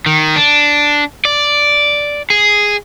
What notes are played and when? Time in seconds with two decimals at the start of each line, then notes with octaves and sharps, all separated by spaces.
0.06 D#3
0.36 D4
1.25 D5
2.30 G#4